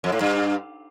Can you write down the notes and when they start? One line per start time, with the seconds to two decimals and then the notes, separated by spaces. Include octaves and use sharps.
0.04 F2
0.12 A2
0.21 G2